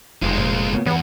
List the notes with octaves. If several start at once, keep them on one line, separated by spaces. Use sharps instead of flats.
F1 D#3 E3 G#3 F4
A#2 F3
C#3 A#3 B3
E2 B3 D5 F#5